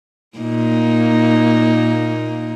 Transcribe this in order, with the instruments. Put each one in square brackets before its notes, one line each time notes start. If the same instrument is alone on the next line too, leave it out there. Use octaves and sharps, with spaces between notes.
[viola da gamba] A#2 A#3 D#4